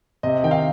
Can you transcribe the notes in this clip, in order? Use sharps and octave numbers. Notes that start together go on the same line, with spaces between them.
C3 D#5
D#3 G5
F5